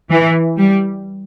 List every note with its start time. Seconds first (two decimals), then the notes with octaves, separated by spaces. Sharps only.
0.11 E3
0.58 G3